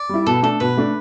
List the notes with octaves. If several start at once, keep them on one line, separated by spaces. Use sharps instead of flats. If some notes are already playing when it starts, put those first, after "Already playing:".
Already playing: D5
G3 E4
B2 A4
A3 D4 A4
B2 B4
A3 D4